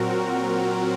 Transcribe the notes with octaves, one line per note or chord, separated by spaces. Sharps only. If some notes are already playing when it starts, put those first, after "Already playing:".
Already playing: A#2 F#3 C4 F#4 A#4